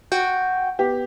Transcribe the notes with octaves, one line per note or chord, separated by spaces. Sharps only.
F#4 G5
B3 G4